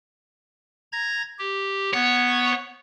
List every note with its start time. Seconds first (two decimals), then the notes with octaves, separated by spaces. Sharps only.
0.92 A#5 G#6 A#6
1.39 G4
1.94 B3 C#5